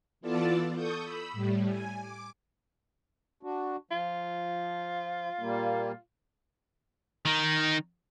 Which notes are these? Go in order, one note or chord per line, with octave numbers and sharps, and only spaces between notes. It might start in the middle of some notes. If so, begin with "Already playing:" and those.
E3 B3 F4 A4 D5 A5
A4 C#6 D#6 G6
B5 E6
A2 G3
G#5
D6
D4 F#4
F3 F4
A#2 G3 A#3
D#3 D#4